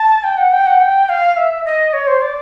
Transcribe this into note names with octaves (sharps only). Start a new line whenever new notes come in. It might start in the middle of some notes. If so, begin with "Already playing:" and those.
Already playing: A5
G5
F#5
G5
F#5
G5
F5
E5
D#5
C#5
C5
D5